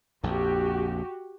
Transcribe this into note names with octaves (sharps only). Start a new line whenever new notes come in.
A#1 F2 F#4 G4